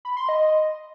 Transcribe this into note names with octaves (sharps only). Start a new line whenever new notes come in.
B5
C6
D#5